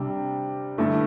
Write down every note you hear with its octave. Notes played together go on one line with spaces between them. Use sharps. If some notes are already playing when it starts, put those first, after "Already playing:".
Already playing: C3 G3 D4
G2 D3 A3 E4